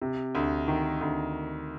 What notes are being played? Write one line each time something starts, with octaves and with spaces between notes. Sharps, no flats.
C3
D2
D#3
D2